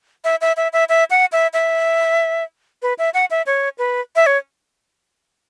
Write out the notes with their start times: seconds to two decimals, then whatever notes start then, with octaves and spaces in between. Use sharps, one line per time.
0.24 E5
0.41 E5
0.57 E5
0.73 E5
0.89 E5
1.10 F#5
1.32 E5
1.53 E5
2.82 B4
2.98 E5
3.14 F#5
3.31 E5
3.46 C#5
3.78 B4
4.16 E5
4.26 C#5